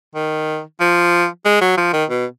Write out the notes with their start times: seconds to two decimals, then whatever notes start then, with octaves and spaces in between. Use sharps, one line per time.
0.15 D#3
0.80 F3
1.45 G#3
1.61 F#3
1.78 F3
1.93 D#3
2.10 B2